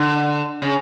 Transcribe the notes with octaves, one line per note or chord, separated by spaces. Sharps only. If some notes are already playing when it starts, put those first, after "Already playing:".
Already playing: D3
C#3